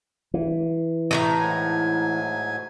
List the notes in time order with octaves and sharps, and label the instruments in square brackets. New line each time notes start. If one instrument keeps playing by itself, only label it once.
[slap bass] E3
[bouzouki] A2 C#3 A#5
[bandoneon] G#2 F#3 G#5